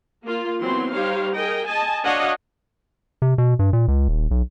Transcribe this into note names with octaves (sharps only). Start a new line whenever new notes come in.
A#3 F4
E3 F#3 B3 C4 C6
G3 D#4 G4 C5 C#5 F5
G#4 A#4 D#5 G5
D#5 G#5 A5
D4 F#4 C#5 D#5 F5 F#5
C3
B2
G2
A#2
C#2
D#1
B1